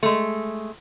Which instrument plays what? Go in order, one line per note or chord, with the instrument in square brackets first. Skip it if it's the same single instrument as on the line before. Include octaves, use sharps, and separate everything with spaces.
[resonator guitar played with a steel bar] G#3 A3